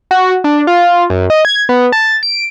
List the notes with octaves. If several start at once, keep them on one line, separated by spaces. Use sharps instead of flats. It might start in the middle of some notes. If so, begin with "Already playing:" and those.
F#4
D4
F4
F#2
D#5
G#6
B3
A5
D7